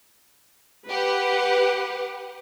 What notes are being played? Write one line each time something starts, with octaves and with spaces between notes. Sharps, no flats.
G4 B4 F#5